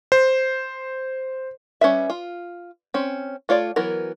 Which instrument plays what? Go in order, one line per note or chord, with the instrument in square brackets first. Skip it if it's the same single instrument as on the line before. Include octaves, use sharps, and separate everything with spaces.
[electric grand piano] C5
[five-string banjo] G3 C#4 B4 E5
F4
C4 C#4
A3 F4 C#5 D5
E3 F#3 B3 A#4